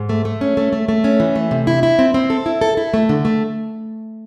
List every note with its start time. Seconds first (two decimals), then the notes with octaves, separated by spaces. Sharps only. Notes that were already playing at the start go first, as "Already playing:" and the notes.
Already playing: G#2
0.09 A3
0.25 A3
0.41 C#4
0.57 A3
0.73 A3
0.89 A3
1.04 C#4
1.20 E3
1.36 A3
1.51 C3
1.67 E4
1.83 E4
1.99 C4
2.14 C4
2.30 A4
2.46 E4
2.61 A4
2.77 E4
2.94 A3
3.09 D3
3.25 A3